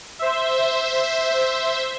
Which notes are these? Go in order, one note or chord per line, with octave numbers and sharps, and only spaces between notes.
C5 E5